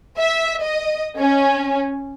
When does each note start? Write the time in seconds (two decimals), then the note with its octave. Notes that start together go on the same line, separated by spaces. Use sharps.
0.18 E5
0.61 D#5
1.19 C#4